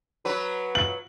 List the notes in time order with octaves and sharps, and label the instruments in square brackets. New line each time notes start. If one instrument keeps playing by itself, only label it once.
[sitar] F#3 B4
[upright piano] F#7